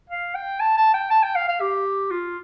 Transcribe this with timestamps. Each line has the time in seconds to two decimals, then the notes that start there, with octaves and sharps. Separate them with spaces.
0.10 F5
0.35 G5
0.60 A5
0.77 A5
0.94 G5
1.10 A5
1.23 G5
1.35 F5
1.48 F5
1.61 G4
2.11 F4